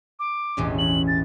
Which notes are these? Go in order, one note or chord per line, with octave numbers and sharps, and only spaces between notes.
D6
E1 A1 C#4
F#7
A6